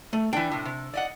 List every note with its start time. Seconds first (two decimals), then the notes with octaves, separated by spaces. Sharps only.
0.13 A3
0.33 E3 D4 G5
0.52 A2 C3
0.65 C3
0.94 D5 D#5 F#5